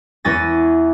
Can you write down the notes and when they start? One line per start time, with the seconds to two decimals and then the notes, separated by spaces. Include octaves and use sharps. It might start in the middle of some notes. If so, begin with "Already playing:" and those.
0.25 E2 C#4 G#5 A6 A#6